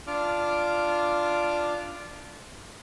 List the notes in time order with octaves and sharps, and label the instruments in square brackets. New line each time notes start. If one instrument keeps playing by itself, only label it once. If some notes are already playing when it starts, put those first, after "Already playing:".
[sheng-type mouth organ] D4 F4 D6 F6